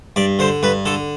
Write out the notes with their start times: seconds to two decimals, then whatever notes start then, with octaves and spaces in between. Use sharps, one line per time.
0.16 G2 D5
0.39 D3 C5
0.63 G2 B4
0.86 D3 A4